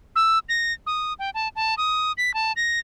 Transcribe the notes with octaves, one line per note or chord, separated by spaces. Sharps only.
E6
A#6
D#6
G5
A5
A5
D#6
B6
A5
A#6